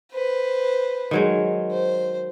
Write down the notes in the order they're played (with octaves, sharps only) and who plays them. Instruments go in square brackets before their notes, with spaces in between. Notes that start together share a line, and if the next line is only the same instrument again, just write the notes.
[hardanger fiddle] B4 C5
[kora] D#3 F#3 G#3
[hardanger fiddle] C5